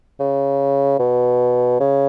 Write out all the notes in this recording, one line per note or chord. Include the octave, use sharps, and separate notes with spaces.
C#3
B2
C#3